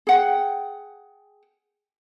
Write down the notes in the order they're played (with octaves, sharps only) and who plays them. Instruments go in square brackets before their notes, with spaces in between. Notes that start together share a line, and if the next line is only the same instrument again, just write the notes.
[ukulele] G#4 F#5 G5